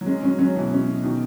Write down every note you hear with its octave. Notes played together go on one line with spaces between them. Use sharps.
F#3
G#3 C#4
F#3 C#4
F#3 C#4
B2 E3
C#4
B2
B2 D#3